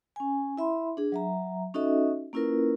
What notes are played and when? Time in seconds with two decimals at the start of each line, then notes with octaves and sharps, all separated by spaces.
0.16 C#4 G#5
0.58 E4 E5 B5 C6
0.97 D4 G#4
1.12 F#3 E5 A#5
1.74 C#4 D#4 F#4 A4 D#5 E5
2.33 A#3 C#4 E4 F4 A#4 B4